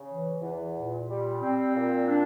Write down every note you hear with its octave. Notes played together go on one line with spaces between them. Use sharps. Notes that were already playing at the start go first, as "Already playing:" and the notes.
Already playing: C#3
E3
E2
A#2
G3
C4
A#2
D4